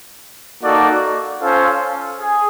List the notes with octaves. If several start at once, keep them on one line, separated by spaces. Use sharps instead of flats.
A#3 D#4 F#4 A4 D5
C#4 F4 A4 C5 F5
G#4